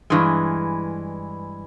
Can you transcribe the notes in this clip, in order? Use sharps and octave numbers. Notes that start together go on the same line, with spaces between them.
G2 E3 G#3